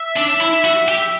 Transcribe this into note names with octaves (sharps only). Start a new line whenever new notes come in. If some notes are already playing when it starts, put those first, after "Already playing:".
Already playing: E5
D4
E4
F#4
G4